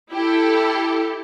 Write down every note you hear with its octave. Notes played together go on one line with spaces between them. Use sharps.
E4 G4 A4